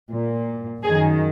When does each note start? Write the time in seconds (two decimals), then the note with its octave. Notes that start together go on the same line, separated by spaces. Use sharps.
0.12 A#2
0.83 F#2 D#3 G#4